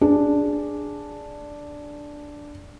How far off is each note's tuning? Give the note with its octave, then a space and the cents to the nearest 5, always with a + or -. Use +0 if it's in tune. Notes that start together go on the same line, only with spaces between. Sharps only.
D4 +0 G#4 +0